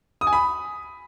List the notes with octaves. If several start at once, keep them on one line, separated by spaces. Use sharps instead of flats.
D#6
G#5
B5